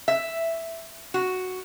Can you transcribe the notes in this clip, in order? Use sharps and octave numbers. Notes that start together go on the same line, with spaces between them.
E5
F#4